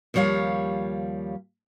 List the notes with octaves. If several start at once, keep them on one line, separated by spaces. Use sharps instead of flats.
D#2 F3 G3 C#5 F5